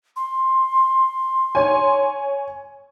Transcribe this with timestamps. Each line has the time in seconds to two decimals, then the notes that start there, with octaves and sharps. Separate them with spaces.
0.16 C6
1.55 C#5 G#5